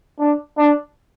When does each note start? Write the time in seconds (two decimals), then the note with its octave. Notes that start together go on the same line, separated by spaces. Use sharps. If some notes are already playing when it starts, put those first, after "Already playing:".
0.19 D4
0.58 D4